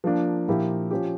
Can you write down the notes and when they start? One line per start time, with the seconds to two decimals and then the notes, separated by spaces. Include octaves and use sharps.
0.04 F3 A#3 D4
0.48 A#2 F3 A#3 E4 G4
0.91 F3 C#4 G4